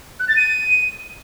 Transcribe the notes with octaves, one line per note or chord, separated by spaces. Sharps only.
F#6
A6
D#7